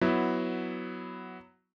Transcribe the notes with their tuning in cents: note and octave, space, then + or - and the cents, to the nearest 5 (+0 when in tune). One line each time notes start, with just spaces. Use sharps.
F#3 +0 B3 +5 E4 +0